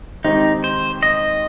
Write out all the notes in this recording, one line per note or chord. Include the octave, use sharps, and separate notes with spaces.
D#3 G#3 C4 D#4 G4
C5
D#5